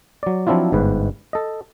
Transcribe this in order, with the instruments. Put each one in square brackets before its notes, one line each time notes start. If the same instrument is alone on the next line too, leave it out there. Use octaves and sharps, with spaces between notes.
[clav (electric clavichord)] F#3 D5
F3 F#3 C4 D4 E4 F4
G1 G#2 B4
A4 D#5